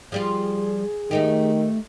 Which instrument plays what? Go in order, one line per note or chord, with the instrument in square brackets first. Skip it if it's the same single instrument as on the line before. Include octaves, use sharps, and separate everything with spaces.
[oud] F3 G3 F4 [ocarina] G#4
[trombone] D#3 [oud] A3 D#4 G4